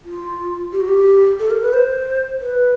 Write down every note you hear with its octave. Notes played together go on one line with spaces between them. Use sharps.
F4
G4
F#4
G4
A4
A#4
B4
C5
B4